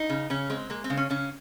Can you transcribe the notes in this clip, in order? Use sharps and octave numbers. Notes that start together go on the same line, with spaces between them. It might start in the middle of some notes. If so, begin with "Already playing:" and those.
Already playing: D#4
C#3
C#3 C#4
G#3 C4
G#3 A#3
C4
C#3
C#4
C#3 C#4